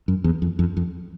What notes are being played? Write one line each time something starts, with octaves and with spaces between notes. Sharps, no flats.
F#2
E2
F2
F2
F2